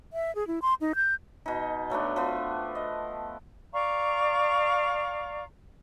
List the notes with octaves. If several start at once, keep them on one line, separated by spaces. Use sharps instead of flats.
E5
G#4
E4
C6
D#4
G6
B2 D#4
F#3 A3 B3 D4
F3 B3
D#5
D5 F5 A#5 C#6